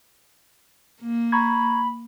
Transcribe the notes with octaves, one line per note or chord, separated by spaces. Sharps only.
A#3
A#5 B5 C#6 G#6